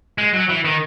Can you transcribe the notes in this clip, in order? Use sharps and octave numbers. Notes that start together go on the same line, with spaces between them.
G#3
F#3
E3
D#3